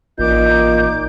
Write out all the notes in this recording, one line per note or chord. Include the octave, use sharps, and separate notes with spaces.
A1 A#2 D#4 D6 G6